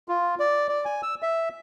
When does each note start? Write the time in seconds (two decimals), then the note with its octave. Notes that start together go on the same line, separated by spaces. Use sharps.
0.08 F4
0.39 D5
0.69 D5
0.85 G#5
1.03 E6
1.22 E5